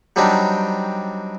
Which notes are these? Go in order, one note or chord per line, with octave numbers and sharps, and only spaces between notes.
F#3 G3 C4 D4 D#4 G4